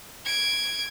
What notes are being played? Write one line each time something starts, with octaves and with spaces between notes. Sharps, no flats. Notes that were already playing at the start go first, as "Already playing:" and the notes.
G#6 D7